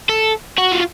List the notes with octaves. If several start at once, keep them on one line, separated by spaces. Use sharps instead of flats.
A4
F#4
F4